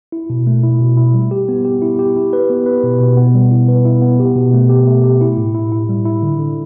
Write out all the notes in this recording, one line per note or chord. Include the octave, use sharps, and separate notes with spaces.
E4
B2
A3
E4
B2
E4
G3
G4
B3
G4
E4
G4
E4
B4
B3
B4
B2
B2
B3
G3
E4
B4
E4
B3
G4
B2
A3
G4
A3
G4
E4
A2
E4
E4
G3
E4
D3
D3